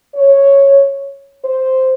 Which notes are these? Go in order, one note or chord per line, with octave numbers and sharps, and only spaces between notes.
C#5
C5